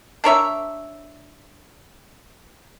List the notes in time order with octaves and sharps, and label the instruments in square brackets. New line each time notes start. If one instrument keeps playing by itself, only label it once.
[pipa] D4 A#4 C#5 E5